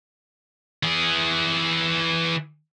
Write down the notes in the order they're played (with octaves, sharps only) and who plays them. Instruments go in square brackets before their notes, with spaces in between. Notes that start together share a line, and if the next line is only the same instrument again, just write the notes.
[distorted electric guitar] E3 G#4